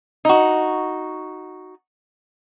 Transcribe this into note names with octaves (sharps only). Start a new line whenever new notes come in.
D#4 F#4